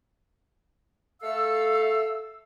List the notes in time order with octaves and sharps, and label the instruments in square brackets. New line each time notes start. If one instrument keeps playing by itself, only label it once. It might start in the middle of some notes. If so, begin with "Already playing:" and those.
[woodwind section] A3 A4 F5 E6